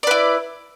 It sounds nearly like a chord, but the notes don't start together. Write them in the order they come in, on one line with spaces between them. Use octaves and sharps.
D5 B4 E4